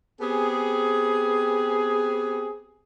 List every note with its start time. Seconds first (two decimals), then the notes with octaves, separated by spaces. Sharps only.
0.21 B3 C4 G4 G#4